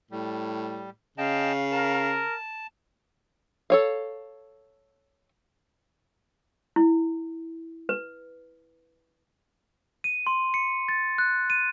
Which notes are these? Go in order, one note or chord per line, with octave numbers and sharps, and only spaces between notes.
A2 G3
C#3 D#5 F5 G5 A5
A#4 A5
A4 C#5 F5
E4
B4
D#7
C6
C#7
A6
F#6
D#7